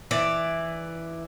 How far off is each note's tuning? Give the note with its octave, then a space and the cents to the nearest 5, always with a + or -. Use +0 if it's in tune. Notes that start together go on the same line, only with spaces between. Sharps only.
E3 +0 D5 +0